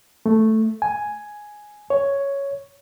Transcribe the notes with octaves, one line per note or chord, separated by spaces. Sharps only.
A3
G#5
C#5